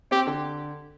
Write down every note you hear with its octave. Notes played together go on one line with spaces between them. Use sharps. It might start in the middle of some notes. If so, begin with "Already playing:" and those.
C4 G4
D3